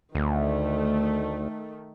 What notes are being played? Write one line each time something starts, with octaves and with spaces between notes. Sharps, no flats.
D2 D#3 A3